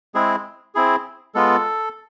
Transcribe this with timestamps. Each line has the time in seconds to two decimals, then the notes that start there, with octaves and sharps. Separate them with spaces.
0.15 G#3 C4 E4 G#4
0.75 C4 E4 G#4
1.35 G#3 B3 F4 A4